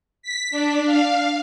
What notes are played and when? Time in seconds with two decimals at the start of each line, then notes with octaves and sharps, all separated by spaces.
0.22 B6
0.51 D4
0.86 F5